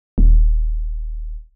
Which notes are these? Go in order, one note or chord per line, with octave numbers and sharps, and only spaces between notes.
D#1